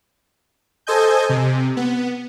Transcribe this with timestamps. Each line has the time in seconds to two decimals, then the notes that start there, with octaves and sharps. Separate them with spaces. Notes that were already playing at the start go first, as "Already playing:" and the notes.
0.87 A4 C5 D#5 G#5 G6
1.29 C3
1.77 B3